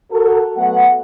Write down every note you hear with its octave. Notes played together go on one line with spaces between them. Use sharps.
F#4 A4 A#4
F#3 A3 B3 F#5